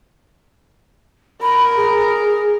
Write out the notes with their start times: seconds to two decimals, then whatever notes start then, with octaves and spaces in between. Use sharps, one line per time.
1.42 A#4 B5
1.77 G#4